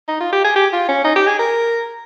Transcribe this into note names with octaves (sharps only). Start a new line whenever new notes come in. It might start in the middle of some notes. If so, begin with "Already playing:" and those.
D#4
F4
G4
G#4
G4
F4
C#4
D#4
G4
G#4
A#4